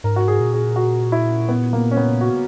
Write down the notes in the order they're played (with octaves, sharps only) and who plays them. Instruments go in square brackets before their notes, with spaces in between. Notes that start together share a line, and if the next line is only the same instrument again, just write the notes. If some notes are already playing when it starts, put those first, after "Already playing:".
[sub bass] G#2 [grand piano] A#4
[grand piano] F#4
G#4
[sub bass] A#2
[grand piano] G#4
F#4
E4
B3
A#3
C#4
B3
F#4